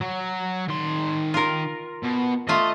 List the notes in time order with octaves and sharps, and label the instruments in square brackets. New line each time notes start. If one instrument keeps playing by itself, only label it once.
[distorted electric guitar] F#3
D#3 C6
[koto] F4 A#4
[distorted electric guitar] B2
[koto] A3 F4 [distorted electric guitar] D#5